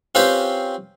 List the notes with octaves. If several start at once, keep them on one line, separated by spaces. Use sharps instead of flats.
C4 C#4 F4 G4 B4 C5